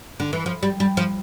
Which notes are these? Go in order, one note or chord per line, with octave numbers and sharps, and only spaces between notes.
D3
E3
F3
G3
G3
F3